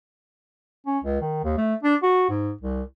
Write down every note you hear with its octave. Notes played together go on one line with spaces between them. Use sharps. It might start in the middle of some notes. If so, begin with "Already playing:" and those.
C#4
C#2
D#3
D#2
A3
D4
F#4
G#2
C2